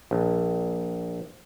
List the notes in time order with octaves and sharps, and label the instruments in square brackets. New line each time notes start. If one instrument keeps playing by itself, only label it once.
[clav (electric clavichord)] A#1